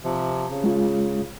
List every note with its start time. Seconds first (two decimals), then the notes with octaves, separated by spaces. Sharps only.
0.04 C3 F3
0.50 C#3
0.64 G#3 F4